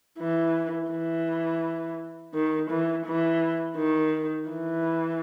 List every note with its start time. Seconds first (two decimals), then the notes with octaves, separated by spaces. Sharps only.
0.19 E3
0.91 E3
2.34 D#3
2.70 E3
3.06 E3
3.77 D#3
4.49 E3